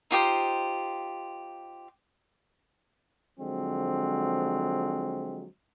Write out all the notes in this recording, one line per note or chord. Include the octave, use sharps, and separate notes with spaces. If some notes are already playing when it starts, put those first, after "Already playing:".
D#4 F4 G4 C5
D3 F3 F#3 G#3 C4